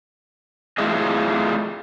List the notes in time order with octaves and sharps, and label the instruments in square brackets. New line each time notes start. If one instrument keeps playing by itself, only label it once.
[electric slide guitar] F#3 A3 E4 F4 G#4 D#5